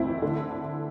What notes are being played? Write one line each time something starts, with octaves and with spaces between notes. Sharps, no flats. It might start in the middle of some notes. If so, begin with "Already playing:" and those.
Already playing: D2 C4 E4
E3
D3